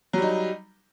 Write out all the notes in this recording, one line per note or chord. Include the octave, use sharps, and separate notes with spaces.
F#3 G3 D#4